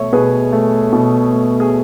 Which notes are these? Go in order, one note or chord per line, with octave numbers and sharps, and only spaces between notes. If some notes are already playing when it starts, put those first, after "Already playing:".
Already playing: B2 A3 C#5 E5
B2 G#4 B4
A3
B2
A3
G#4